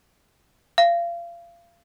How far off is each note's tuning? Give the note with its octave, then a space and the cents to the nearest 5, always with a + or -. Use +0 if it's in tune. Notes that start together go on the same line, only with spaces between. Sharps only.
F5 -30